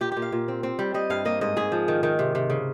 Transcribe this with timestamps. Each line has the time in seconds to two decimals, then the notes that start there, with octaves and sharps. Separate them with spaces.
0.01 A#2 G4
0.12 A#2 G4
0.22 F5
0.32 A#2
0.48 C4
0.63 C4
0.79 G3
0.94 G3 D#5
1.10 G2 F5
1.25 A#3 D#5
1.41 G#2 D#5
1.56 G#2 G#4
1.72 F3
1.88 D#3
2.03 D#3
2.19 C3
2.35 C3
2.50 C#3